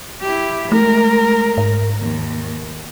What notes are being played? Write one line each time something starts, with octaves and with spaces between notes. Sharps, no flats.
E4 G4
G#3 A3 A#4
G#2
D#2